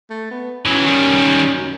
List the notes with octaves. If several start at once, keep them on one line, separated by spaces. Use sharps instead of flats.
A3
B3
E3 F#3 C#4
D#3 G3
F#2